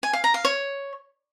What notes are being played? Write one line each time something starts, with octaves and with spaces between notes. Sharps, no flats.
G#5
F5
A#5
F5
C#5